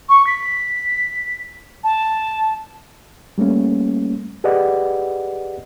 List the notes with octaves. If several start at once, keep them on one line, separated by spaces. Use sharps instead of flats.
C#6
B6
A5
G3 A3 A#3 C#4
G4 G#4 B4 D5 D#5 F#5